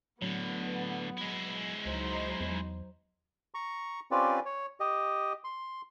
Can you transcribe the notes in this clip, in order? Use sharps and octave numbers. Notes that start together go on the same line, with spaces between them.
A2 D3 F#3 B3
G#3 E4
C#2 F#3 D#4 C5
E2
A#5 C#6
C4 C#4 F4 G4 B4 D5
C#5
G4 D#5
C6